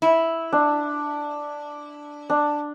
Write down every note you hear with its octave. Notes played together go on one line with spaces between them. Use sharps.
E4
D4
D4